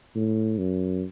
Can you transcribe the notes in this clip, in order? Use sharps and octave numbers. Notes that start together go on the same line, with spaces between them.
A2
F#2